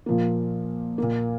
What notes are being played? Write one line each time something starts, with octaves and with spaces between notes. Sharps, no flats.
A#2 F3 A#3
A#2 A#3